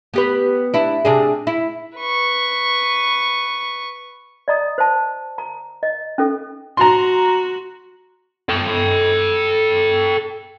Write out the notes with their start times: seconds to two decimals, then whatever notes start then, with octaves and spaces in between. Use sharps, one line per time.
0.14 B3 G4 B4
0.74 D4 E4
1.05 C3 D4 G#4
1.47 E4
1.98 B4 C#6
4.48 D5 D#5 A#5 D#6
4.78 C5 A5
5.38 A#5
5.83 D#5
6.18 C#4 A4
6.77 F#4 A#5 C6
8.49 A4 G5